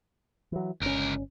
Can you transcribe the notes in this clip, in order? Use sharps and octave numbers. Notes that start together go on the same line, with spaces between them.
E3 F#3
G1 C#2 C#4 A#4